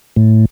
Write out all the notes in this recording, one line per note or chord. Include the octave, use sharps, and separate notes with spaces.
A2